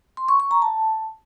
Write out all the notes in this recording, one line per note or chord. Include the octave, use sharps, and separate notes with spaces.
C6
C#6
C#6
A#5
A5